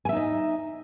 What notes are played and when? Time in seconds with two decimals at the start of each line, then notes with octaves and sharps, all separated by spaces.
0.05 G#5
0.09 E5
0.13 D#4
0.16 D#5